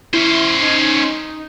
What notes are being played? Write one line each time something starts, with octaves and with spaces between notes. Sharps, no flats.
C#4 E4 C5
D#4